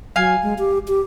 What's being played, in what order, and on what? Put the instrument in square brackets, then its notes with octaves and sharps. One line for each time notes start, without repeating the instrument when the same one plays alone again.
[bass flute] F#3 [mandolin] F5 G#5
[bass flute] G#3
G4
G4